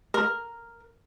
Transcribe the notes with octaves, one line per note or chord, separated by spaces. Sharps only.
A#4